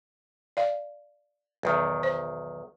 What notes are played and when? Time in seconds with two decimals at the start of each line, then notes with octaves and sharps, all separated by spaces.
0.57 D5 F5
1.63 B1 E2 D#3
2.03 C5